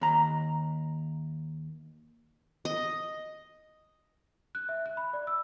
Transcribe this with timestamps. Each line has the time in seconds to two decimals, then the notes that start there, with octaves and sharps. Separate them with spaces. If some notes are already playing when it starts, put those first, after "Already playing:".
0.01 D#2 A#5
2.65 D#5
4.55 F#6
4.69 E5
4.86 F#6
4.97 B5
5.13 D5
5.27 E6